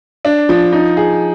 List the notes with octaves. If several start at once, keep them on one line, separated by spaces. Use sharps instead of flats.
D4
F3
D#4
G#4